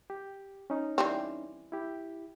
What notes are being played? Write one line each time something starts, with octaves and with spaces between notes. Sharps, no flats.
G4
C#4 D#4
E3 G3 C4
E4 G4